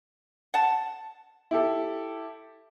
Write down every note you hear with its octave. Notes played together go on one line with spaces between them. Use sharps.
F#5 A5
E4 G4 A4